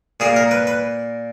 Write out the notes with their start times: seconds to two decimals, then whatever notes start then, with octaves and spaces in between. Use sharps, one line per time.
0.20 A#2 A#3 G#4
0.36 A#4
0.51 B4
0.67 B4